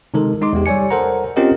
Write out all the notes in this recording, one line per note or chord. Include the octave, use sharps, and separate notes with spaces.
C3 D#3 G#3 D#4 A4 A#4
G#3 D#4 D#5 C6 D6
E2 G#3 G4
G3 C#5 D5 G#5 C#7
A4 A#4 C5 F#5 A#5
C4 C#4 F4 G4 A#4 D#5